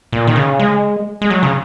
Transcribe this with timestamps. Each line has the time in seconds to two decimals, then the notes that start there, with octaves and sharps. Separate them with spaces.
0.12 A#2
0.27 D#3
0.36 C#3
0.59 G#3
1.22 G#3
1.30 F#3
1.43 C#3